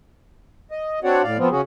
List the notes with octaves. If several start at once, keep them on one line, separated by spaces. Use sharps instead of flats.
D#5
C4 D4 F#4 C#5 D5 F#5
A2 D5 F5
F3 B3 C4 F4
C#3 C#4 F#4 G#4